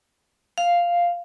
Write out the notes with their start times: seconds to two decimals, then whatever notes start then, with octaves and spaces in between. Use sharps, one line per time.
0.58 F5